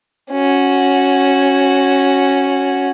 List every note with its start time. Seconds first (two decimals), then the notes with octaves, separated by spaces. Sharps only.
0.30 C#4 F#4